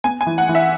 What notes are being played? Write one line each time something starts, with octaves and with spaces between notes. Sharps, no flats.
B3 G#5
G#5
E3
F#5
E3
E5